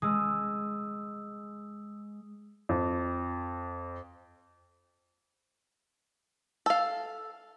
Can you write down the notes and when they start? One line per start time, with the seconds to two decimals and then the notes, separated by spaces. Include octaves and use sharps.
0.02 G#3 D#6 E6
2.69 F2
6.66 A4 F5